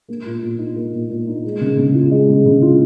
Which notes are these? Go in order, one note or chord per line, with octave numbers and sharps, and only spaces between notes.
A#3
A#2
A#2
D#4
A#3
A#2
A#2
D#4
G#3
C#3
C#3
F4
G#3
C#3
C#3
F4